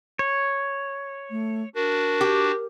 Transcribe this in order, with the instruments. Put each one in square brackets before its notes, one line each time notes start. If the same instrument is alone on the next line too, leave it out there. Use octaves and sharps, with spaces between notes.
[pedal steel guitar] C#5
[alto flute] A3
[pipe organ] D4 F#4 [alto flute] A#4
[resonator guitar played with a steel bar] G4